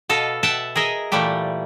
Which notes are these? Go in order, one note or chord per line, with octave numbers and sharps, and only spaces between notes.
B2 A4 D#5 F5
B2 E5 F#5 G5 A5
G#4 A#4 D#5 E5
A#2 E3 G3 A3 G4